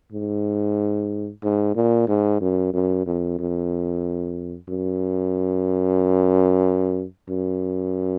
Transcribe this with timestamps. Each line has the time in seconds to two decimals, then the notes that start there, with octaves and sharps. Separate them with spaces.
0.12 G#2
1.44 G#2
1.75 A#2
2.08 G#2
2.41 F#2
2.74 F#2
3.06 F2
3.39 F2
4.69 F#2
7.29 F#2